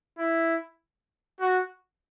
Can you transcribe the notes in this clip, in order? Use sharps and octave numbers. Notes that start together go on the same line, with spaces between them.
E4
F#4